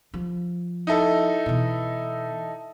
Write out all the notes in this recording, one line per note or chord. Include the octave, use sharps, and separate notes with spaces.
F3
D#4 E4 A4
B2 E3